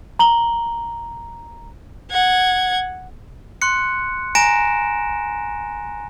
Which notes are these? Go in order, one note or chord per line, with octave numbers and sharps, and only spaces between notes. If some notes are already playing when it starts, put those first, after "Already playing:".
A#5 F#7 G7
F#5 G#6
C6 F#6 C#7
G#5 A#5 A#6 D7 E7